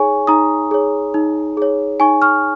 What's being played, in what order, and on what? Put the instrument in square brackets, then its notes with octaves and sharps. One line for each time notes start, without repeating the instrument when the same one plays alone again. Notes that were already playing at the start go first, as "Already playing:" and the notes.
Already playing: [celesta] D#4 G#4 C#5 G#5 C#6
D#4 A#5 D#6
G#4 C#5
D#4
G#4 C#5
D#4 G#5 C#6
C#6 F6